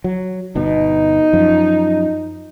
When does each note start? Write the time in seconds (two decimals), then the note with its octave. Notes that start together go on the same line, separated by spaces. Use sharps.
0.04 F#3
0.56 G1 B2 D#4
1.33 F#2 F3